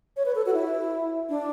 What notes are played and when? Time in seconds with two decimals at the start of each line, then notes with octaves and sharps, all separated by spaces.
0.17 C#5
0.25 B4
0.35 A4
0.46 F#4
0.54 E4
1.29 D4